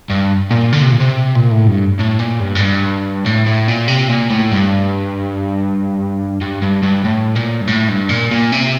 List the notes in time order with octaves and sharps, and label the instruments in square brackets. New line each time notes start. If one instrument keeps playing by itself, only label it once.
[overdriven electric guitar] G2
A#2
D3
C3
A#2
C3
A#2
A2
G2
A2
A#2
G2
A2
G2
A2
A2
A#2
C3
A#2
A2
G2
G2
G2
G2
A2
A#2
G2
A2
G2
A#2
A#2
C3